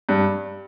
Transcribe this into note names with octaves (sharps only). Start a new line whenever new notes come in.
G2